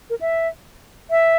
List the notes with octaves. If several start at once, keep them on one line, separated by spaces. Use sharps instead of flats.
A#4
E5
E5